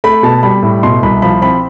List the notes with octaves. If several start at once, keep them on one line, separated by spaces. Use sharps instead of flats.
A3 B5
B2 A5
G3 B5
A2
B2 C6
C2 B5
F3 B5
C4 B5